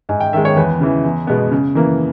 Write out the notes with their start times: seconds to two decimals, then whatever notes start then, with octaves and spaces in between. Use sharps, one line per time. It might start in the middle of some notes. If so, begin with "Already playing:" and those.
0.09 G#2 G#5
0.20 G5
0.33 D#3 G#3 E5
0.45 C#5
0.56 E2 B4
0.80 C#3 E3
1.04 E2
1.27 B2 G#3 B3
1.51 C#3
1.75 E3 A#3